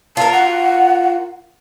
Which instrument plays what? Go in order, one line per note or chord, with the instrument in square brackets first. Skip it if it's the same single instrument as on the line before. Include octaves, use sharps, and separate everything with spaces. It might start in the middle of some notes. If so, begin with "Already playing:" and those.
[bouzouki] F4 A#4 [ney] A5
[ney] F#5